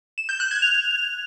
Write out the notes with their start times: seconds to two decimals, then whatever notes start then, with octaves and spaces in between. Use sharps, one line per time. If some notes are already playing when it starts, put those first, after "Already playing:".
0.18 E7
0.29 G6
0.40 F#6
0.51 G#6
0.62 F7